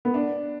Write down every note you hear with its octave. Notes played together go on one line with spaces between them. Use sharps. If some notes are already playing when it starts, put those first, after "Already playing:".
B3
D4